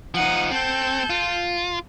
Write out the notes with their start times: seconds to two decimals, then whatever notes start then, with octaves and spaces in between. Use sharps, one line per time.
0.14 F3 D#4 F#5 D#7
0.51 C4 A4 G6
1.10 F4